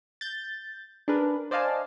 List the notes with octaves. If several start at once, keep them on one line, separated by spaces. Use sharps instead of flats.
G6 A6
D4 G#4 A#4 B4
C5 D5 D#5 F5 G#5 A5